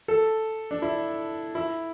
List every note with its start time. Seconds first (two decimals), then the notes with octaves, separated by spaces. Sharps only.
0.08 A4
0.71 D4
0.82 E4
1.55 E4